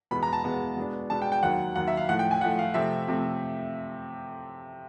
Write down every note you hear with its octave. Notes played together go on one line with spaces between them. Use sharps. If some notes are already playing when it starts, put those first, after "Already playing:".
E2 B2 G#3 B3 B5
A#5
A5
E2 B2 G#3 B3
B2 G#3 B3 D4
B2 G#3 B3 D4 A5
G5
G5
D#2 D#3 F#3 F#5
D#2 D#3 F#3 F#5
E5
F5
A2 F3 A3 F#5
G5
G#5
A2 F3 A3 F#5
F5
C3 F3 A3 C4 E5
C3 F3 A3 C4